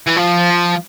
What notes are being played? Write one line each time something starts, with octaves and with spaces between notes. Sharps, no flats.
E3
F3